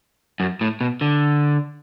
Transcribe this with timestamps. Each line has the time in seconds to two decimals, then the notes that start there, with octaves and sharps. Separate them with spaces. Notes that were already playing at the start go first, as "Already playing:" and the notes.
0.40 F#2
0.61 A2
0.81 B2
1.01 D3